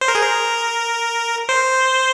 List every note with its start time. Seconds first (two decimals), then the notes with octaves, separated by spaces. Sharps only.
0.01 C5
0.08 A#4
0.15 G#4
0.23 A#4
1.49 C5